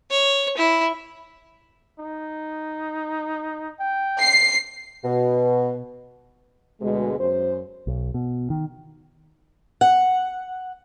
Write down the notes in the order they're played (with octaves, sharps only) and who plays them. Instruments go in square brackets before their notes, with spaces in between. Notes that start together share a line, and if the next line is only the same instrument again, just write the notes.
[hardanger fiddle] C#5
E4
[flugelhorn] D#4
G5
[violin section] C7
[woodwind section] B2
[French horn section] D2 B2 G#3
F#2 C5
[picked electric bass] B1
B2
D#3
[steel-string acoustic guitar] F#5